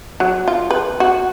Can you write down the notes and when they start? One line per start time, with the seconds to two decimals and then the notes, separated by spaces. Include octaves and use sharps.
0.20 F#3
0.48 F4
0.71 B4
1.00 F#4